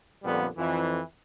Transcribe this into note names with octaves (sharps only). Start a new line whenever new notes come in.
F2 A#2 D3 G3 B3
F2 E3